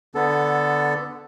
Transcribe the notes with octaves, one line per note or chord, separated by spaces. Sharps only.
D3 B3 A4